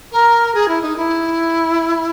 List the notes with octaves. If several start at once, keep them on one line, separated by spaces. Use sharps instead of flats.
A#4
G#4
E4
D#4
E4